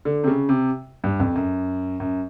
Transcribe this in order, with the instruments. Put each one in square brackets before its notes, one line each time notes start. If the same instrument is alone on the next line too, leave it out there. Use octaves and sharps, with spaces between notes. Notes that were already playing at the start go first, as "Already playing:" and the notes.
[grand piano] D3
C3
C#3
C3
G2
F2
F#2
F#2